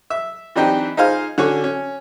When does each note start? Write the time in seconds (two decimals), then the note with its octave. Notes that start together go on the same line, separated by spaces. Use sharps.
0.10 E5
0.56 E3 C4 D4 D#4 G4
0.97 D#4 F4 G#4 C5 F5
1.38 D3 C#4 F#4 C#6
1.64 C#4